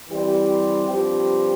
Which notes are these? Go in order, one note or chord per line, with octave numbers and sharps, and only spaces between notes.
E3 G3 C4 G4 D5
G2 F3 C4 G4 C5